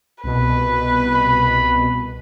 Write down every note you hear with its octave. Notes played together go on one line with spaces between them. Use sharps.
C2 B2 B4
B5